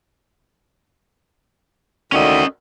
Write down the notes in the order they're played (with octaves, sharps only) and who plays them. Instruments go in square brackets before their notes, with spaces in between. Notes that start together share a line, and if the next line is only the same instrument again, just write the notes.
[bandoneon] D2 D3 D#3 [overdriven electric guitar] C#4 D#5